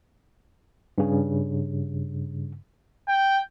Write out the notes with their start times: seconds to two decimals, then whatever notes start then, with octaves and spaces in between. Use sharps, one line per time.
0.98 G2 C#3
3.08 G5